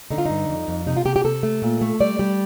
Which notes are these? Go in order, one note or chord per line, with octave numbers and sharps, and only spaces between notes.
D3 D#4
F4
G2 D#4
F2
F2
C3 D#4
F4
C3 G4
G4
C3 A4
A3
A#2
A3
G3 D5
G3